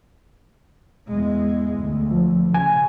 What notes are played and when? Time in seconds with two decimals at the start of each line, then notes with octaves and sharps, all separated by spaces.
1.08 E2 G#3
1.80 D2
2.11 F3
2.54 C#3 G#5